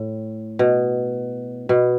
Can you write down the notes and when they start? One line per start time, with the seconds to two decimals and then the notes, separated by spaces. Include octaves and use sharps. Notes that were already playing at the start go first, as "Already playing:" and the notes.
Already playing: A2
0.59 B2
1.69 B2